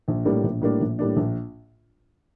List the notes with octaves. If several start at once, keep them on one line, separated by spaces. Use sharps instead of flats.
A#1
A2 G3 A#3 D4
A#1
A2 G3 A#3 D4
A#1
A2 G3 A#3 D4
A#1